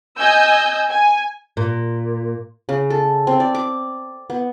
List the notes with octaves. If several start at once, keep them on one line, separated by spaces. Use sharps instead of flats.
D#5 G#5 E6 G6
G#5
A#2
C#3
A4
C4
D5
D6
B3